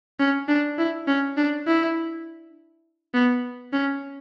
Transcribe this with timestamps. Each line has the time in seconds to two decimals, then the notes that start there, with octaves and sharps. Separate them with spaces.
0.20 C#4
0.49 D4
0.78 E4
1.08 C#4
1.37 D4
1.67 E4
3.14 B3
3.73 C#4